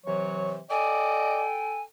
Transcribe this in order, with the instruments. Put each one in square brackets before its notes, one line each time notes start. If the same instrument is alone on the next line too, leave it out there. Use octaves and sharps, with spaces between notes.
[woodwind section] C3 E3 F#3 [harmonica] C#5
[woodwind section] A4 G5 [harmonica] D5 D#5 [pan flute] G#5